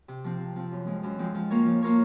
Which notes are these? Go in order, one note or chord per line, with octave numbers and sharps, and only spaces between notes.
C3
F3 C4
C3
F3 C4
F#2
F3 G#3 C4
F#2
F3 G#3 C4
F3
A#3 F4 A#4 C#5
F3
A#3 F4 A#4 C#5